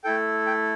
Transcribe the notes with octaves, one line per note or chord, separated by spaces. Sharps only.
A3 E4 A4 G5
G5